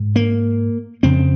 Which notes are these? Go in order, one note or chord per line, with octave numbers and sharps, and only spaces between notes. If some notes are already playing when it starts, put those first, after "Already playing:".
Already playing: G#2
A#3
F2 C#3 C4